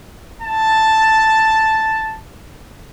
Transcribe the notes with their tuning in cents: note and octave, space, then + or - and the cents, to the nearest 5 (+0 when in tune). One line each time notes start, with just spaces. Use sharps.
E4 -40 A5 +0